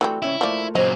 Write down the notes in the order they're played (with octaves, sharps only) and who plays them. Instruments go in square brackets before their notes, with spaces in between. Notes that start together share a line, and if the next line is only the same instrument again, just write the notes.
[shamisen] E3 G3 C4 [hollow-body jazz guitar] A3 F#4 A4
[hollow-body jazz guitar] C#2 C#4 E5 [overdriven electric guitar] E4
[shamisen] F3 D5 [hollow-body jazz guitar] A3 A#3 F4
[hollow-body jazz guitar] F#2 C#3 C#5 [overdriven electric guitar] A#2 F#3 [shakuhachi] C5 [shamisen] D#5